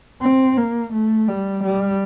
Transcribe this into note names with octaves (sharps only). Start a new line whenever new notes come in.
C4
A#3
A3
G3
G3